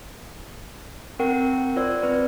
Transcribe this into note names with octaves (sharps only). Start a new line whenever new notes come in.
C4 A#4 F#5 G5
F4 C5 D5 E6
C4 B4 D5